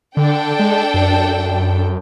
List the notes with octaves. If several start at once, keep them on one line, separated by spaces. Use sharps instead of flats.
D3 D4 A4 G5
G#3
F#2